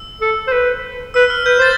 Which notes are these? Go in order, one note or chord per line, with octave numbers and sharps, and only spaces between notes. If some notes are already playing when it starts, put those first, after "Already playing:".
Already playing: E6
A4
C5
B4
B4 E6
F6
B4 G6
C5 A6